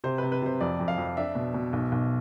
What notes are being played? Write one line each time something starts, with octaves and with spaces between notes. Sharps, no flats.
C3 C5
C3 B4
B4
C3 C5
F2 D5
F2
F5
F2
D4 E5
B2
B2
B1
B1